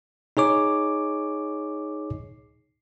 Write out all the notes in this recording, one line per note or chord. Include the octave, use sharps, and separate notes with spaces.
D#4 G#4 C#5 D6